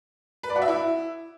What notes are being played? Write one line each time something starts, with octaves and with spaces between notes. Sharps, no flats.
B4
D5
F#4
E5
E4